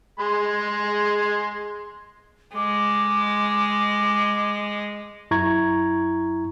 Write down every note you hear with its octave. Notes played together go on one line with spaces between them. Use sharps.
G#3 G#4 C6
G#3 D6
F#2 E4 A#5 C#6 G#6